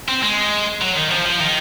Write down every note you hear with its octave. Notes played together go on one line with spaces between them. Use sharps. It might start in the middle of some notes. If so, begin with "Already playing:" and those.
C4
G#3
F#3
D#3
F3
F3
D#3